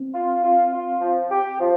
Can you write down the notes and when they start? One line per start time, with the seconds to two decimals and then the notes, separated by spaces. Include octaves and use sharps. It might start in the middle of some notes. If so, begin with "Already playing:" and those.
Already playing: C4
0.14 F4
0.43 F4
0.72 F4
1.01 F3
1.31 G4
1.59 F3